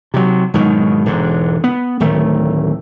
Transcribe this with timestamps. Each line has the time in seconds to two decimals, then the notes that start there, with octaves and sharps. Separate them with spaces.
0.14 C3 F#3
0.54 G#2 B2 D#3 F#3
1.06 E1 G#2 D3
1.64 B3
2.00 D1 D#3 A3